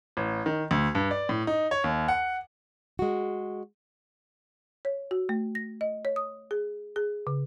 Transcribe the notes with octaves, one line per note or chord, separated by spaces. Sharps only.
A1
D#3
D2
G2
D5
A2
D#4
C#5
D#2
F#5
G#3 F#4
C#5
F#4
A3
A#6
D#5
C#5
D#6
G#4
G#4
C#3